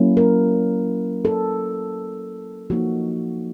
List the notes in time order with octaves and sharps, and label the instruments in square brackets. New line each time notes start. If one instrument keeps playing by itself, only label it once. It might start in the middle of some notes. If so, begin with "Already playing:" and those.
Already playing: [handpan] F#3 A#3 C#4 E4
A#4
A4
F3 A#3 D#4 F#4